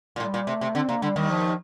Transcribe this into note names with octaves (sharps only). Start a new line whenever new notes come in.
A#2
A2 G3
A#2
C3 A3
C3
D3 C4
C3 A#3
D3 G3
D#2 D#3 G3
F3